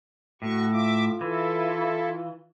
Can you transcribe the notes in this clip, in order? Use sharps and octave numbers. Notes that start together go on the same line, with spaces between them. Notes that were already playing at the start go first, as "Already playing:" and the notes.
A2 F#4 C#6
F4 E5 D6
E3 E4 A4